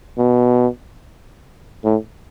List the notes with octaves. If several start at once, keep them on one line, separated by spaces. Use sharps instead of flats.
B2
A2